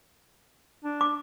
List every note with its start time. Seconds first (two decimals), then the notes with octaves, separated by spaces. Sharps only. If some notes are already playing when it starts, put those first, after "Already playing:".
0.84 D4
1.01 D6